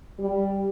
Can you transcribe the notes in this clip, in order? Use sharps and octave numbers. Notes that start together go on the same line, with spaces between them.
G3